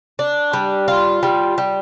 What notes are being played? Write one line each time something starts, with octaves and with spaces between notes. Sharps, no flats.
D4
G3
F4
G3
G3